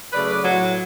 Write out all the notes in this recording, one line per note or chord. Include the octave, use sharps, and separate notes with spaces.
C#3 F#3 A3 B4 D5
B4 D5
A2 F#3 A3